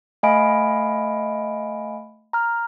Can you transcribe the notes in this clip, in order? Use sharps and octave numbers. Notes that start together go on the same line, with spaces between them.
A3 D#5 F5 G#5 B5 D7
A#5 F6